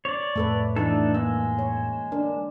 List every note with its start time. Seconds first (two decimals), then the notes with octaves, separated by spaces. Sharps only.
0.05 C#5 D5
0.36 F2 A2 A3 A4 B4
0.76 E3 A3 D4 D#4 A4
1.15 G#3 A#3 E6
1.59 C#5
2.12 D4 A#4